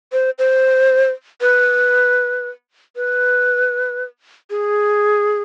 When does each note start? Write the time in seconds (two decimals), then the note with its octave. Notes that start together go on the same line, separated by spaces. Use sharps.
0.12 C5
0.39 C5
1.41 B4
2.96 B4
4.50 G#4